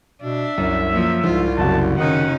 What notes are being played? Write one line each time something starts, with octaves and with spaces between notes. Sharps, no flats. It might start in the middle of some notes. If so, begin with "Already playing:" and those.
B2 D4 E5
C2 F#2
F3 A#3
C2 G#2 F3 F4
F#1 F#2 C3 F#4 A5
D#3 C#4 D#4 F#5